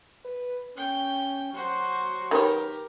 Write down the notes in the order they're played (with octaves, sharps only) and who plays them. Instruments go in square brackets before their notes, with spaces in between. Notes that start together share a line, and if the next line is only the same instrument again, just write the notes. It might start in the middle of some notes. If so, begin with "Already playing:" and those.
[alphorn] B4
[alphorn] C#4 [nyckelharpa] G5
[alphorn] F#3 [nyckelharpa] F#4 C5
[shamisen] D#3 B4 C#5 [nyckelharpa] G4 A#4